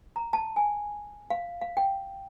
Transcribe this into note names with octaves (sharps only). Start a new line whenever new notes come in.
A#5
A5
G#5
F5
F5
G5